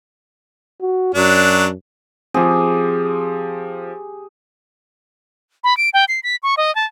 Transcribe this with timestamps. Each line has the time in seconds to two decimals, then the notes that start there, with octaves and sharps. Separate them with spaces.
0.81 F#4
1.15 F#2 F#3 D4
2.34 F3 C4 G4 G#4
5.64 B5
5.77 D7
5.94 G5
6.08 C7
6.23 B6
6.43 C#6
6.57 D#5
6.75 A5